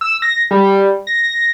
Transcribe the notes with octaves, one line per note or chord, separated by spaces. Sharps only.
E6
A#6
G3
A#6